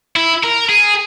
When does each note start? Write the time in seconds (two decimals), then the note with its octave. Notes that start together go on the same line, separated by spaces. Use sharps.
0.16 E4
0.44 A#4
0.70 G#4